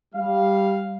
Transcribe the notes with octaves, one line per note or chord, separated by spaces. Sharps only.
G3 F5